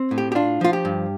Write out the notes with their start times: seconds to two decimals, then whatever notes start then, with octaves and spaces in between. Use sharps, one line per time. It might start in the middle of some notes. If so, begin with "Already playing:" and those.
Already playing: C4
0.11 A2
0.18 G4
0.32 G4
0.35 D4 F4
0.61 F3 F4
0.73 G4
0.85 G2